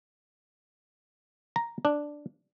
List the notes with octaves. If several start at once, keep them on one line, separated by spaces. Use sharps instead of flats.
A#5
D4